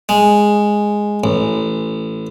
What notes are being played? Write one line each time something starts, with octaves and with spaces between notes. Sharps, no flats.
G#3
A1